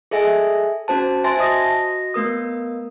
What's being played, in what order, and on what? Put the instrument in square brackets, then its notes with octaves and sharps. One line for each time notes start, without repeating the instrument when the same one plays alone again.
[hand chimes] G#4 A4 D#5 E5 G#5
C#4 F#4 C5 A5
C5 E5 G#5 A5 C6 A6
F#4 D#5 D#6 A#6
A3 B3 A#4 D#6